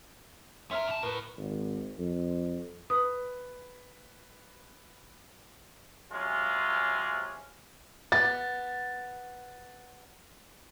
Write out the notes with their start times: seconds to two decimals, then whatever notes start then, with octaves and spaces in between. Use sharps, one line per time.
0.71 C#4 A#4 E5 C6 F6
0.87 G2 A5
1.03 A2 A#4 B4
1.38 G#1
1.98 F2
2.90 B4 D#6
6.10 C3 F#3 G#3 C#4 F4
8.12 B3 A6